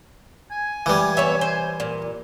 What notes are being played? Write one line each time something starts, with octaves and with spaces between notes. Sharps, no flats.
G#5
E3 G3
B3 C#5 E5
C5
A#2